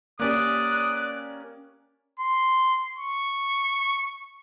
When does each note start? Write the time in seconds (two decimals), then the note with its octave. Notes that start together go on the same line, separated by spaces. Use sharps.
0.20 A#3 C#4 G4 D5 D#6 F#6
2.20 C6
2.99 C#6